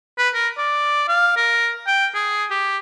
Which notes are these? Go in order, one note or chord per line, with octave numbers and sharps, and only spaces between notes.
B4
A#4
D5
F5
A#4
G5
G#4
G4